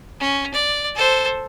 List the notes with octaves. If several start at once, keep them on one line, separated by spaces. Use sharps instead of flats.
C#4
D5
A4 C5